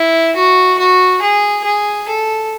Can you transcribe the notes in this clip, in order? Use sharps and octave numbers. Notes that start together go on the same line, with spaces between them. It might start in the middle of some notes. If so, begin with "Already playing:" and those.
Already playing: E4
F#4
F#4
G#4
G#4
A4